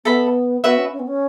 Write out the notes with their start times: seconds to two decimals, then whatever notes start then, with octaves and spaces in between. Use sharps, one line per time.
0.05 B3 A4 E5 B5
0.64 B3 F#4 B4 E5
0.78 C#4
0.92 C#4
0.99 B3
1.07 C#4